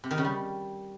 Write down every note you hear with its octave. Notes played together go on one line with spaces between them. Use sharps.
C3
D#3
C#3
G3